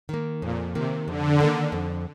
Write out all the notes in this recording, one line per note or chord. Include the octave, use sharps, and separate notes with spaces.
D#3 A#3
F2 A#2
C3 D#3 A#3
F2 D3
D#3 A#3
F2